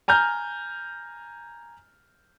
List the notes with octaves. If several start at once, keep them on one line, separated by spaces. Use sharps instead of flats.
G#5 A#5 F6 G6